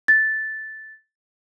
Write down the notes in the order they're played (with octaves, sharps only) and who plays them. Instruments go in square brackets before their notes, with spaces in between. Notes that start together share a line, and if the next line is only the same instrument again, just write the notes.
[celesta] A6